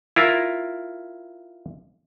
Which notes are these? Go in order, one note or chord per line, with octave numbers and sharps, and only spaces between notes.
E4 F4 A#4